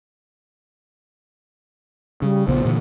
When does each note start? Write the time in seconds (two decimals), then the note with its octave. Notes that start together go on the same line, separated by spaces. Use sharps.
2.22 C#3 G3
2.48 A#1 C#3 B3 C5
2.65 A#2 D3 E3